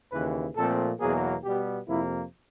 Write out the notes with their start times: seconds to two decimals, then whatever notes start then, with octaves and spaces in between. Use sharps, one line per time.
0.12 D#2 C#3 E3 B4
0.56 A#2 F3 A3 C4 A4
1.00 E2 B2 F#3 A#3 G#4
1.44 B2 G3 B3 G4
1.88 F2 C3 F3 A#3 E4